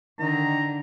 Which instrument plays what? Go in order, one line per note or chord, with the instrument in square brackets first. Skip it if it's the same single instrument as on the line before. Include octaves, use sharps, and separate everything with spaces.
[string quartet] D3 [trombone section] D#3 [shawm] A#5